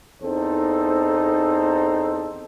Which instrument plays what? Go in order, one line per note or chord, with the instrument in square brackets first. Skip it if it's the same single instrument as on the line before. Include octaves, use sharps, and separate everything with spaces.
[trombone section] E2 C4 D#4 A4 C5